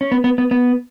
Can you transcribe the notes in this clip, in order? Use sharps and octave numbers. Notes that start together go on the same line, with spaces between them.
C#4
B3
B3
B3
B3